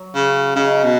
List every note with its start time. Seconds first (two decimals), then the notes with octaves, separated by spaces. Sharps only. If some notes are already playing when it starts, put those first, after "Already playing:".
Already playing: F#3
0.14 C#3
0.56 C#3 D#4
0.84 B2